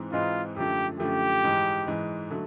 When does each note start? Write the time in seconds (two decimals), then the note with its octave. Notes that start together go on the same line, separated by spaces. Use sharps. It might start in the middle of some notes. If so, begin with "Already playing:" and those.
Already playing: G#2 E3 G#3 C4 D#4
0.12 G#2 E3 G#3 C4 D#4 F4
0.56 F#2 D3 F3 A3 G4
1.00 F#2 D3 F3 A3 G4
1.44 G#2 E3 G#3
1.87 G#2 E3 G#3
2.30 D3 F#3 A3